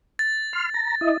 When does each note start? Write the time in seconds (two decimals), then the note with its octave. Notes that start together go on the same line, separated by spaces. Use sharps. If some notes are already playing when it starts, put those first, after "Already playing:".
0.19 A6
0.53 C6 F6
0.74 A#5
1.01 E4 D#5